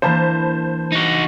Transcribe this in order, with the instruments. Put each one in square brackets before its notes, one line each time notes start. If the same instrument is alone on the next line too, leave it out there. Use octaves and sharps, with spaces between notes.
[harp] E3 A#3 D4 [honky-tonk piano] C5 A5 B5
[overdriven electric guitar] D#4 F#4